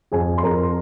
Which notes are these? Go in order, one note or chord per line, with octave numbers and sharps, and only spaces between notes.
F2 G#4 G#5
C6
F2 A#4 A#5